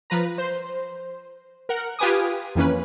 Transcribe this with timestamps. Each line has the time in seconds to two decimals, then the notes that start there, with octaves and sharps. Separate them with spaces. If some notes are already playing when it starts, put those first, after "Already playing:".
0.10 F3 B4 A#5
0.38 C5
1.69 A#4 F#5
1.99 F4 G4 B4 G#5 D6 D#6
2.55 F2 E3 A#3 C#4 B4